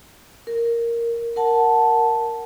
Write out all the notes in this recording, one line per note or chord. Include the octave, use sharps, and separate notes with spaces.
A#4
A#4 F#5 A5